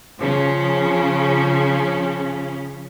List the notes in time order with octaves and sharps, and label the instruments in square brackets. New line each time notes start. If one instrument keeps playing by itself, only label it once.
[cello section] C#3 F3 C#4